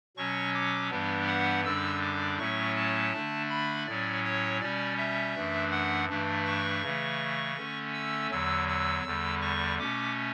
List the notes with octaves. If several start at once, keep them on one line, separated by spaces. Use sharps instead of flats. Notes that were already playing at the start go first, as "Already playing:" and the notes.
B2 F#3 C#4 C#6
D6
G2 E3 G3 B3 D4
F#5
F#2 D3 G3 D4 E6
D6
A2 F#3 A3 C#4 C#6
A5
D3 A3 D4
B5
A2 F#3 C#4 D5
C#5
B2 G3 C#4 D5
E5
F#2 E3 A3 D4
F#5
G2 E3 A3 D4
C#6
C#3 E3 A3
D3 A3 C#4
E6
E2 D3 F#3 E6
E6
E2 D3 G3
C#6
B2 A3 C#4 D6